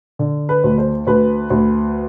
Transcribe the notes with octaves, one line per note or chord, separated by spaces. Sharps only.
D3
B4
D2
C5
D2 B4
D2